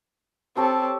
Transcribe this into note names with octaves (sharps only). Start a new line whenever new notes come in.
C4 G4 A4 C#5 A5